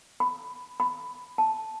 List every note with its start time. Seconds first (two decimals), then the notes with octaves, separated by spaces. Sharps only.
0.20 B5
0.80 B5
1.38 A5